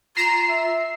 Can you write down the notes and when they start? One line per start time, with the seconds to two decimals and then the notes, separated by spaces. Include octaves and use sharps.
0.17 F4 A#5 C7 E7
0.49 E5